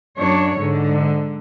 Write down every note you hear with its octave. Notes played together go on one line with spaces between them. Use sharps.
F#2 D4 C#5
G#2 D3